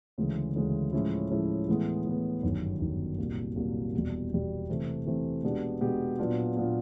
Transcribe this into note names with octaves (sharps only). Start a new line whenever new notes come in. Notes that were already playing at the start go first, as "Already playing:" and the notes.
D2 C#3 E3 G#3
D2 C#3 E3 G#3
A2 F3 G#3 C#4 E4
A2 F3 G#3 C#4 E4
A2 E3 G#3 B3
A2 E3 G#3 B3
G1 F#2 D#3
G1 F#2 D#3
C2 A#2 F#3 A#3
C2 A#2 F#3 A#3
E1 E2 B2 G3
E1 E2 B2 G3
C3 E3 A3 C4
C3 E3 A3 C4
B2 G#3 B3 D4 G4
B2 G#3 B3 D4 G4
A#2 F#3 B3 D4 F4
A#2 F#3 B3 D4 F4